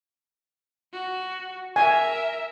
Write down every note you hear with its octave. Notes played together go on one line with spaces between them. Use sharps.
F#4
A#4 E5 G#5